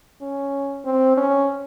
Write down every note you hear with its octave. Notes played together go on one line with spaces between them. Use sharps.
C#4
C4
C#4